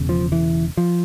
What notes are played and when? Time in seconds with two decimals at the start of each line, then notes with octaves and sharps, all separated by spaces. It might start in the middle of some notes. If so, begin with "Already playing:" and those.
Already playing: E1 E2 C#3
0.09 F3
0.32 E3
0.77 F3